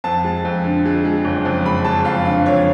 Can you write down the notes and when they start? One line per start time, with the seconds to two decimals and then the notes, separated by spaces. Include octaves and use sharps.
0.04 F2 A5
0.24 G#3
0.45 F2
0.64 D3
0.85 G#3
1.05 G#3
1.25 F#1
1.45 F2
1.66 G#3 B5
1.85 G#3 A5
2.05 F2 F5
2.25 D3 F5
2.46 F2 C#5